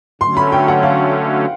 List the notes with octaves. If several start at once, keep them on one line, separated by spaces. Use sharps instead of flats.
D3 F#3 A3 C#4 C6
B5
G5
F#5
F5